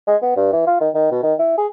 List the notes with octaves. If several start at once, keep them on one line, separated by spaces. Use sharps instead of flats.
G#3
B3
G2
E3
F4
D#3
D#3
B2
D#3
E4
G#4